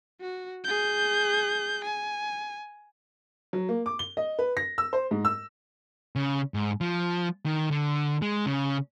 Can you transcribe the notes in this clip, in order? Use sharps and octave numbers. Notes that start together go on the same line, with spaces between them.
F#4
G#4 G6
G#5
F#3
A#3
D6
G7
D#5
B4
A#6
E6
C5
G#2
E6
C#3
G#2
F3
D#3
D3
G#3
C#3